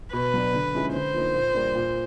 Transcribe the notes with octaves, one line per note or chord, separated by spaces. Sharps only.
B2 B4
F#3 B3 D4
D3
F3 G#3 C#4 E4
D3 C5
F3 A#3 D#4
A#2
G3 A#3 D4
A#2